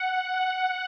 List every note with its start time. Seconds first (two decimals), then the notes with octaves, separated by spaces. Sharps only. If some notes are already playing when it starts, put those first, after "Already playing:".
Already playing: F#5
0.33 F#5